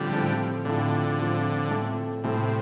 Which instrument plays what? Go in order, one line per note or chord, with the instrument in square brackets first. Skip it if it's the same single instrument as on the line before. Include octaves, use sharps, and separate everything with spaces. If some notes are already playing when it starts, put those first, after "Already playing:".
Already playing: [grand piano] A2 F3 C4 A4 [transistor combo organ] D3 G3
[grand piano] A2 F3 C4 A4
[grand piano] A2 F3 C4 F4 A4 [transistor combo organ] D3
[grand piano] A2 F3 C4 F4 A4
A2 A3 C4 A4
[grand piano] A2 A3 C4 A4 [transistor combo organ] C3